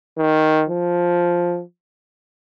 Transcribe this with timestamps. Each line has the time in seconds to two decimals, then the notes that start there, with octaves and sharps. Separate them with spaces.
0.18 D#3
0.69 F3